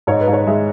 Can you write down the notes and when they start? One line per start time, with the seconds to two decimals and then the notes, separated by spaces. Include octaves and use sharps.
0.07 G#2 C#5
0.21 B4
0.27 G#2
0.33 C#5
0.47 G#3 E5